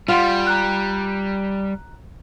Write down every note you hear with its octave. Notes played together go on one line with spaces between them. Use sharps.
G3 F4 F5 F#5 C6
A#5 F#6